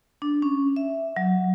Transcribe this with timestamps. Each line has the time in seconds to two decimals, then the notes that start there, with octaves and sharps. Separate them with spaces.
0.22 D4
0.42 C#4
0.76 E5
1.17 F#3